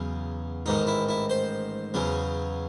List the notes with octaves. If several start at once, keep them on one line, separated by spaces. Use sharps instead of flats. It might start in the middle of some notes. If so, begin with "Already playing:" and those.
Already playing: E2 C#3 F#3
A1 G#2 D#3 D#4
E4
E4
C5
E2 C#3 F#3